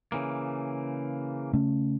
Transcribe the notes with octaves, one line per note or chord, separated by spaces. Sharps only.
C#3 E3 A#3
C#3 A3 C#4